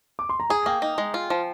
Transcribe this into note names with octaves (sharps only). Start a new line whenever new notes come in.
D6
C6
A#5
G#4 G#5
A#3 G5
D#4
G#3
F4
F3